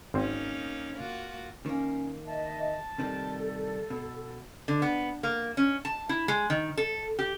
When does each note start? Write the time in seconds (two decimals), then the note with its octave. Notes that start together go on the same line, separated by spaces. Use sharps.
0.14 G#1 A#3 C4 C#4 D#4
0.95 A#3 F4 F#4
1.66 D#3 A#3 C#4
2.27 D#5 E5 A5
2.98 C3 D#3 G3 A4
3.90 B2 E6
4.68 D3
4.82 B3
5.23 A#3
5.57 C#4
5.85 A5
6.09 E4
6.28 G#3
6.50 D#3
6.77 A4
7.19 G4